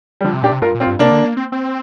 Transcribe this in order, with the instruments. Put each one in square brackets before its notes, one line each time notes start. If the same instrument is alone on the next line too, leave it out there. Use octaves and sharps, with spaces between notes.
[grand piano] G3
[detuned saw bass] D3 [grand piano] F3
[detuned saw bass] C3
[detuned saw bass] A#2 [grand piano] D4 G4
[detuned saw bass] C3
[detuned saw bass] G2 [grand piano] F4 A#4
[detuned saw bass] A#2
[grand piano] C4 F4
[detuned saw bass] G2
[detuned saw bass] C3 [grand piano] A#3 D4
[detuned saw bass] D3
A#3
C4
C4